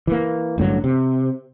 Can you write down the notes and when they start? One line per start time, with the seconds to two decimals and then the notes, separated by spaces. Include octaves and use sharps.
0.07 E3 A#3
0.58 A1 G2 D3 F#3
0.84 C3